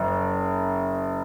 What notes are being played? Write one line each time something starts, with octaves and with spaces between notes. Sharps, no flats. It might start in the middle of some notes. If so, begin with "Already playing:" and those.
Already playing: F#1